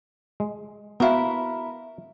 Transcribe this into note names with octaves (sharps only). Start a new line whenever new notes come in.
G#3
B3 E4 F#4 A#4 F5